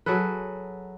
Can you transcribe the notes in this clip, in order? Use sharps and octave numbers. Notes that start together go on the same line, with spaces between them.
F#3 G#4 A4 B4